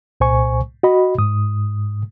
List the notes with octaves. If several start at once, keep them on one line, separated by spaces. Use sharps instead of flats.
C2 A#2 C5 G#5 C#6
F#4 D#5 B5
G#2 D#6